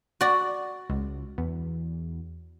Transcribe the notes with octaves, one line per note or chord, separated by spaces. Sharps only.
F#4 D5
C#2
E2